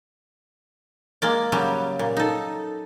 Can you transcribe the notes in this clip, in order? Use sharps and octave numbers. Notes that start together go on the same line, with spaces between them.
G#3 A#3 D5
C#3 F#3 G3
A#2
D#4 A4